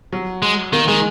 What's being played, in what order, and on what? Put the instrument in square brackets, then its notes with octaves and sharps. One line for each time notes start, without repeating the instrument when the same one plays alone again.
[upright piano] F#3
[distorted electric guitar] G#3
[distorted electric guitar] D#3 [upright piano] A#3
[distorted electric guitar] D#3 [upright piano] G#3